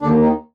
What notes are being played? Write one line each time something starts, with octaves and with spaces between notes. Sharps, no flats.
D#2 D3 D4
D#3 D#4